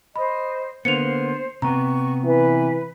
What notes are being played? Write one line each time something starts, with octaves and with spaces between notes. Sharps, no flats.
C5 D#5 B5
D3 A#3 B3 C5 C#7 F7
C3 B3 A#5 C#6
E3 B4